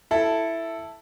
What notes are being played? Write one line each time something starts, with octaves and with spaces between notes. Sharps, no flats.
E4 A4